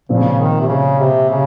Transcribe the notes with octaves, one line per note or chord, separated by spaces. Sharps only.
A#2 C#3 F3 C4
D#3
C3
C#3
C3
C#3